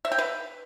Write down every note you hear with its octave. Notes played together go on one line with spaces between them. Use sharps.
E5
G5
B4